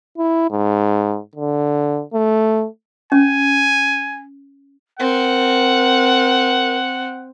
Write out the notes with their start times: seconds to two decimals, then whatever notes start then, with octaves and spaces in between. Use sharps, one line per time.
0.18 E4
0.51 G#2
1.35 D3
2.14 A3
3.12 C#4 G#5
4.99 C4 A#4 F#5